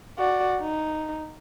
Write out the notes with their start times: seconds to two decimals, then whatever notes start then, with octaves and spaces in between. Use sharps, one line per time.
0.19 F#4 D5
0.61 D#4